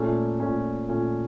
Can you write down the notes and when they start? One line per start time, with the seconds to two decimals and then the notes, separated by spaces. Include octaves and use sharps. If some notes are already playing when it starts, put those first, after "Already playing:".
Already playing: A#2 A3 C#4
0.40 A#2 A3 C#4
0.89 A#2 A3 C#4